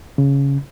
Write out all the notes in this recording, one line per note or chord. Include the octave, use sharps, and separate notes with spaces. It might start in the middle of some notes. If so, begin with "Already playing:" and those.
C#3